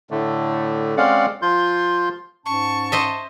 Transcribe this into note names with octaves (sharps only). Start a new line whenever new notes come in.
A2 D3 A3
G#3 C4 C#4 D5 F5 F#5
F3 F4 C6 G6
G#2 C#4 A5 C#6
C5 D#5 E5